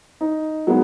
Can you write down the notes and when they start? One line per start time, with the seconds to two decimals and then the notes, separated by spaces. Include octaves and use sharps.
0.21 D#4
0.67 F#3 G#3 A#3 B3 D#4